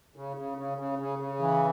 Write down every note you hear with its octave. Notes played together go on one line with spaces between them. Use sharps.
C#3
C#3
C#3
C#3
C#3
C#3
E3